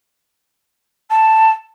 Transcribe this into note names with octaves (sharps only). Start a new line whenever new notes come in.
A5